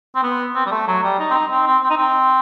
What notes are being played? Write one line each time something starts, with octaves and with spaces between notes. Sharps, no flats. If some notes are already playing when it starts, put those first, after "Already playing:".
C4
B3
C4
G3
A3
F#3
G3
D#4
C4
D#4
C4
C4
C4
D#4
C4